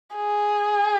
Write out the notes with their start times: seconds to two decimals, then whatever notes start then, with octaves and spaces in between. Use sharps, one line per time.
0.16 G#4